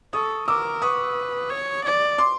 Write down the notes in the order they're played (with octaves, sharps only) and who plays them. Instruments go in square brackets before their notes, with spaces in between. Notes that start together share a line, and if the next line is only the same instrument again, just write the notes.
[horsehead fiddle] A4 [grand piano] C#6 D#6
[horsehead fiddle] A#4 [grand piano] D6 E6
[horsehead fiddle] B4 [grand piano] C#6 D#6
[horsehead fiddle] C#5
D5
[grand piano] C6 D6